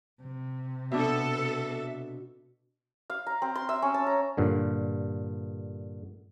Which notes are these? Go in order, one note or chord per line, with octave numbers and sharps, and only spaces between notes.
C3
B2 B3 D4 A4 E5
F5
A#5
C4
C6
E5
C#4
A5
A#5
G2 A#2 D3